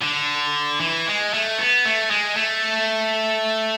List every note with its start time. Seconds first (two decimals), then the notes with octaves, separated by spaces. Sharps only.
0.02 D3
0.80 E3
1.07 G#3
1.34 A3
1.58 B3
1.85 A3
2.10 G#3
2.36 A3